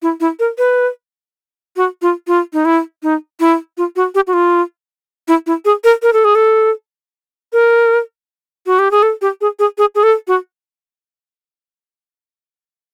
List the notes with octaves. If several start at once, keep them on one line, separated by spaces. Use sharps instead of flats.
E4
E4
A#4
B4
F#4
F4
F4
D#4
E4
D#4
E4
F4
F#4
G4
F#4
F4
E4
E4
G#4
A#4
A#4
A4
G#4
A4
A#4
F#4
G4
G#4
A4
G4
G#4
G#4
G#4
G#4
A4
F#4